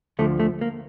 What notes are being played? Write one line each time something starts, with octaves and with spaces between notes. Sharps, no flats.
D2 D3 F3 A3
A3
A#3